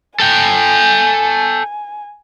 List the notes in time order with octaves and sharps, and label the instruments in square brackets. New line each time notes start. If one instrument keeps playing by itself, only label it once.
[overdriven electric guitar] A4 G5 [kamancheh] G#5